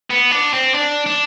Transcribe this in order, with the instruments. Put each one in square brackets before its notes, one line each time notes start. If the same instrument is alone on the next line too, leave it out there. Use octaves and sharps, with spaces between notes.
[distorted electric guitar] B3
D4
C4
D4
D4